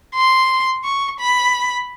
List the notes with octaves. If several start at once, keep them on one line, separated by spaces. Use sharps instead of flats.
C6
C#6
B5